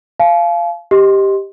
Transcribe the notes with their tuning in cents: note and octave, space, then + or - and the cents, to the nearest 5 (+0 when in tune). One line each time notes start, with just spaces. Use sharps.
F5 -15 A5 -45
G4 +0 D#5 +0 C6 +10